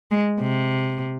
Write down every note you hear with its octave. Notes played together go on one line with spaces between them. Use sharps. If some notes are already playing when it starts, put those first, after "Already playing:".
G#3
C3